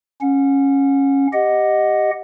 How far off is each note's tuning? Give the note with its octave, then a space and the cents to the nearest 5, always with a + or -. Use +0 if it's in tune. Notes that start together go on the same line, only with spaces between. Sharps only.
C#4 -10 F#5 -30
G4 +0 D#5 +0 F#5 +0